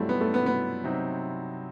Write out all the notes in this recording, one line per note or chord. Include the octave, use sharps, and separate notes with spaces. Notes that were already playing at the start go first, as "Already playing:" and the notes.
Already playing: G2 F#3 G3 A3 C4 E4
B3
A3
B3
B3
C3 F#3 C4 D#4